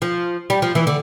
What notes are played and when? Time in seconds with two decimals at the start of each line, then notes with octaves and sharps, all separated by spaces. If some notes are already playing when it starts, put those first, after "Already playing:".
0.02 F3
0.50 G3
0.62 F3
0.75 E3
0.87 D3